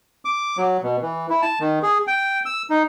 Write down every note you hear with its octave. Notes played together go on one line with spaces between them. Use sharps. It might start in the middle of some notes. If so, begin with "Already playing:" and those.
D6
F#3
B2
E3
E4
A5
D#3
G#4
G5
E6
D#4